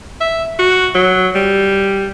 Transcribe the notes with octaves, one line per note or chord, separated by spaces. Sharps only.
E5
F#4
F#3
G3